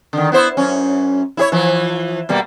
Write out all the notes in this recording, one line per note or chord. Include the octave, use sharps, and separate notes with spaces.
D3 D#3
B3 E4 C5
F#2 C#4
E4 G#4 C#5
E3 F3
B2 G3 A#3